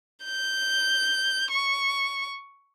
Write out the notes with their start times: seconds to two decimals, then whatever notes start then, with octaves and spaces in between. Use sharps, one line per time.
0.24 G6
1.51 C#6